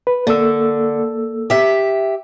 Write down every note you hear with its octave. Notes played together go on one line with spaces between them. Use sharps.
B4
D3 A#3 A4 E6
G4 E5